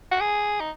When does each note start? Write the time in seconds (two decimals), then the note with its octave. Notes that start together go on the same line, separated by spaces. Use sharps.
0.11 F#4
0.20 G#4
0.60 D#4